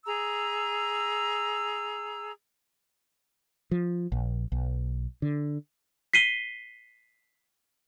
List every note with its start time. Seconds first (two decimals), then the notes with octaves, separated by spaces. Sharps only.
0.06 G#4 A#5 E6
3.71 F3
4.12 A#1
4.52 B1
5.22 D3
6.13 B6 C7 D#7 G7